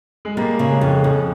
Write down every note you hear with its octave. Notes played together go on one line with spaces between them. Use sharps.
G#3
G3 A#3
C#3
G#3
F2
F2